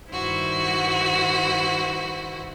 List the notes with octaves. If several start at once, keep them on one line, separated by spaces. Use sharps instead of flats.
G2 D#3 E4 F#4 C5